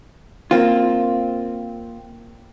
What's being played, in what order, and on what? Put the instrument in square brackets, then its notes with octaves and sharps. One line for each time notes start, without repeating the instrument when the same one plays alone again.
[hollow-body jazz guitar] A#3 C4 F4